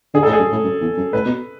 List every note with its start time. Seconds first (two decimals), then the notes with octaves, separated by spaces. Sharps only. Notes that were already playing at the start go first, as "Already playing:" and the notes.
0.14 D3 G#4
0.23 A2 A4
0.33 G#4
0.39 F#2
0.51 A2
0.63 F#2
0.81 E2
0.97 F#2
1.13 A2 B4
1.25 B2